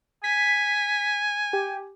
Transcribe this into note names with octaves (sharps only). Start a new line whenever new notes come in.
G#5 B6
G4